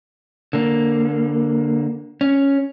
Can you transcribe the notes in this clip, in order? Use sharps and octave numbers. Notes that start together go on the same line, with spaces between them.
D3 A#3
C#4